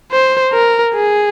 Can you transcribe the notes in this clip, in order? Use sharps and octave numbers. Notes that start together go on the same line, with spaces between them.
C5
A#4
G#4